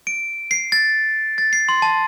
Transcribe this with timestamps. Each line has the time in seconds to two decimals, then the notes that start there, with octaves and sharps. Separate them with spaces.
0.07 D7
0.51 C7
0.72 A6
1.38 A6
1.53 C7
1.69 C6
1.82 A5